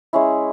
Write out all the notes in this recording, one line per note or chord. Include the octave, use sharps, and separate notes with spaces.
G#3 C#4 E4